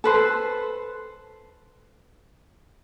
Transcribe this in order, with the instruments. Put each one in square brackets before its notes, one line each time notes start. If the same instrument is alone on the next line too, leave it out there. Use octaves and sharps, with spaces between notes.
[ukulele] A4 B4 C5